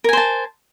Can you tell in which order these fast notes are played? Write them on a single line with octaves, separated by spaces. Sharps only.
A#4 G#5 C5 A5